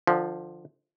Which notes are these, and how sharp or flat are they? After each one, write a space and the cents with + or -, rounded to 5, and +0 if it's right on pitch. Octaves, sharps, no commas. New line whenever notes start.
D3 +30 F3 +0